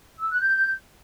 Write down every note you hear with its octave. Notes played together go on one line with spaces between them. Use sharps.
E6
F#6
G6